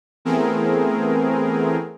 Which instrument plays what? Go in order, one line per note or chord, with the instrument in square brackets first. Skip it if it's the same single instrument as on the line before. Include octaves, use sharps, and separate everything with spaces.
[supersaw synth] E3 A3 B3 C4 G#4 A#4